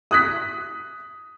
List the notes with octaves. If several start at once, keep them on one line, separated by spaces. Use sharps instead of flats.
D#6 F#6 B6